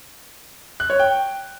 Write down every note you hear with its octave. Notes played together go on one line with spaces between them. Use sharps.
F#6
C#5
G5